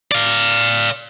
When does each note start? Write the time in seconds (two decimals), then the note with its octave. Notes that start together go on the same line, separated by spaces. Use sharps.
0.12 D5 F5